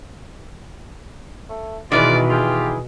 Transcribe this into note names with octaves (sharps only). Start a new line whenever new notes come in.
A3
B2 D#3 E3 G#3 F4 G#4 B4 D5
F4 G4 G#4